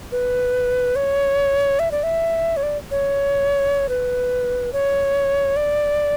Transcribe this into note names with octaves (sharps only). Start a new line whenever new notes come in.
B4
C#5
E5
D5
E5
C#5
D5
C#5
B4
C#5
D5